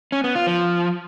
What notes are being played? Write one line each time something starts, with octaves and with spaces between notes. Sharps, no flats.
C#4
B3
F4
F3